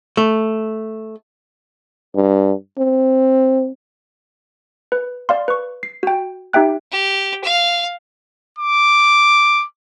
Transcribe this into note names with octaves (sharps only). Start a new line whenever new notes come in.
A3
G2
C4
B4
D5 F5 C6
B4 C#6
C7
F#4 G5
D#4 G4 E5 G5 F#6
G4
F5
D6